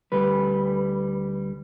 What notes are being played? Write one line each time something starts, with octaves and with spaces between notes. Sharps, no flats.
D2 G3 B4